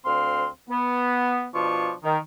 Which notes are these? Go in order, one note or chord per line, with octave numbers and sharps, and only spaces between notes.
D2 C4 F5 C6
B3
B2 F3 D4 F4 C#6
D#3